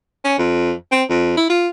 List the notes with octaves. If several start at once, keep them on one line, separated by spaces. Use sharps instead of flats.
C#4
F2
C4
F2
E4
F4